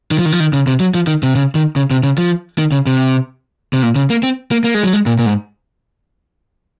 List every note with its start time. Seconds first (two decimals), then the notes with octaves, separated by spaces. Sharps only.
0.11 D#3
0.19 F3
0.26 D#3
0.32 F3
0.40 D#3
0.53 C#3
0.67 C3
0.80 F#3
0.94 F3
1.07 D#3
1.23 C3
1.35 C#3
1.55 D#3
1.76 C#3
1.91 C3
2.03 C#3
2.18 F3
2.58 D#3
2.72 C#3
2.87 C3
3.73 C3
3.83 A#2
3.96 C#3
4.10 A#3
4.23 C4
4.51 A#3
4.64 A#3
4.74 G#3
4.84 F#3
4.93 G#3
5.06 A#2
5.19 A#2
5.26 G#2